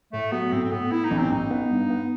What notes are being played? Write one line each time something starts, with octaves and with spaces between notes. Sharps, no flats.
A2 A3
F#3 B3
A2 C4
C4
A2 B3
B3 E4
D#4
A1
C4
A1 D#4
B3
G2
B3